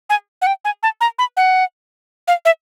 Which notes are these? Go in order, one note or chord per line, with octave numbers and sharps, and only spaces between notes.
G#5
F#5
G5
G#5
A5
A#5
B5
F#5
F5
E5